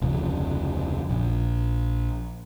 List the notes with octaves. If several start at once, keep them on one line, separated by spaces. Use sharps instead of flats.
F1 D2 C#3 F3
A#1